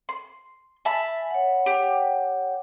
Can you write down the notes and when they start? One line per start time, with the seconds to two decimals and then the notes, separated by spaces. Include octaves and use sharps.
0.09 C6
0.85 E5 G#5 A5 B5
1.31 C#5 F#5
1.66 G4